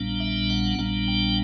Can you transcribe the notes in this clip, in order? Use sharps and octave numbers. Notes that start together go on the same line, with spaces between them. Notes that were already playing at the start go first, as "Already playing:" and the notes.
Already playing: A#1 A#2 G3 B3 D4
E5
F#5
A#1 A#2 G3 B3 D4
G5